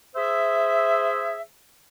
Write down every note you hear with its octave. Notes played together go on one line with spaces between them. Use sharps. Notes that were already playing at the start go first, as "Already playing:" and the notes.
G#4 C5 E5